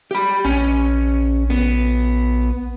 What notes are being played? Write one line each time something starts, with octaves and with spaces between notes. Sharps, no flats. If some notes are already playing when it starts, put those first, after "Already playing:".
G4 B5
A#1 C#4 C#5
B3